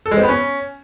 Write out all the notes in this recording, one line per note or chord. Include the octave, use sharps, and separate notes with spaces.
A4
G#3
C4
B3
C#4